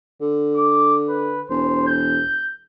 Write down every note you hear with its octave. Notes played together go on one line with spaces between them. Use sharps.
D3
D6
B4
E1 C5
G6